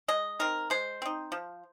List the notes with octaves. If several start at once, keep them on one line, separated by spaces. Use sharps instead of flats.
G#3 D#5
C4 D#4 A#4
G#3 C5
C4 D#4
F3